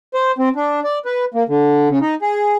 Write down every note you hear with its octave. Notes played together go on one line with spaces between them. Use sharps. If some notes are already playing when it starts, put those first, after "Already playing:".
C5
C4
D4
D5
B4
A#3
D3
C#3
D#4
G#4